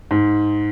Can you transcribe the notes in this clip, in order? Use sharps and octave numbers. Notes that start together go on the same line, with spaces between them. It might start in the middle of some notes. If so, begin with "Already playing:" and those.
G#2